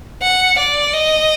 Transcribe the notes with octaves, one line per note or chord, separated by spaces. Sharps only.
F#5
D5
D#5